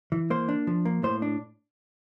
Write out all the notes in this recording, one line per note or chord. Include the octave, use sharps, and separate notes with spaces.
E3
A#3 C5
D4
F3
A#3
A2 C5
D4